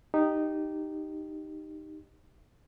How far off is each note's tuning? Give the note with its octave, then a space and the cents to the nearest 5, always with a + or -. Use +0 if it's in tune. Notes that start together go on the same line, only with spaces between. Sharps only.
D#4 -10 G4 +0